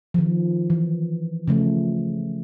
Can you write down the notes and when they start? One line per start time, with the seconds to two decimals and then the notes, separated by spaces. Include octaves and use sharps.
0.14 D#3 F3
0.70 E3
1.48 C#3 F3 A3